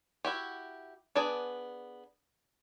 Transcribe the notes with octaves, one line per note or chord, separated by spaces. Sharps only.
E4 F#4 G4
B3 D4 G#4 D5